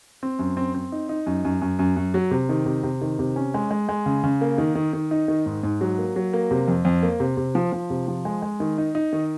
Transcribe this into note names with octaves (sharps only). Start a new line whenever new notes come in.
C4
F#2
C4
C4
D#4
D#4
F#2
F#2
F#2
F#2
F#2
F#3
C3
D#3
C3
C3
D#3
C3
C#4
G#3
G#3
G#3
C#3
C#3
A#3
D#3
D#3
D#3
D#4
D#3
G#2
G#2
F#3
A#3
F#3
A#3
C3
F2
F2
A#3
C3
C3
F3
F3
C3
F3
G#3
G#3
D#3
D#4
D#4
D#3